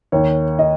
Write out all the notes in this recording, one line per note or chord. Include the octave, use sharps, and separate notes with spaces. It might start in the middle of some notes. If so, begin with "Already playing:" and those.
D#2 C#5
D#5